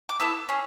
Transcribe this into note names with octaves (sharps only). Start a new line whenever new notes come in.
D6
B3 E4 A4 E6
C#4 G#4